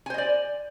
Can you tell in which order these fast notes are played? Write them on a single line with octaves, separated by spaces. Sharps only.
G#5 C5 D#5 D5